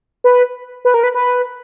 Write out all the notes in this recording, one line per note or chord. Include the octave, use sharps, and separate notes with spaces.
B4
B4
A#4
B4
B4